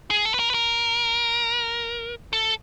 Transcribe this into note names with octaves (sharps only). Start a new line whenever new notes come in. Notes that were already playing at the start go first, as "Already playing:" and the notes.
G#4
A4
B4
A#4
B4
A#4
A4